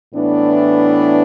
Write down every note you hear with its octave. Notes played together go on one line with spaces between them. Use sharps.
A2 E3 B3 D4